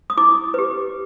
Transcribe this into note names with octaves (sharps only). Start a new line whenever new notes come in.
D#6
E4 D6
G4 B4